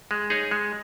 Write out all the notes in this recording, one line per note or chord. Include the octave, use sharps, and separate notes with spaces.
G#3
D#4 G#4 C#5
G#3